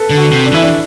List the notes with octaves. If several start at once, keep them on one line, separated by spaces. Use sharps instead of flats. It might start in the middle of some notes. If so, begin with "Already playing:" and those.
Already playing: A4 B4
D3
F#4
C3
D4
E3 E4
D4